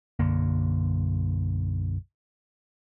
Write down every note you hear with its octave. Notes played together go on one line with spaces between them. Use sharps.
B1 F#2 D3 A#3